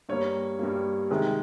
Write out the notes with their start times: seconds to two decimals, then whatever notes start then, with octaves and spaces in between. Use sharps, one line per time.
0.09 G2 G3 A#3 C#5
0.59 G2 G3 A#3
1.11 C3 D#3 G#3